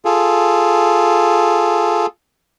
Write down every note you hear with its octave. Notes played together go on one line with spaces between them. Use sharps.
F4 G#4 A4